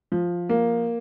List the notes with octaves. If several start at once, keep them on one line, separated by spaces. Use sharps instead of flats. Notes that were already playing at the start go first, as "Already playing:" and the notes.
F3
A#3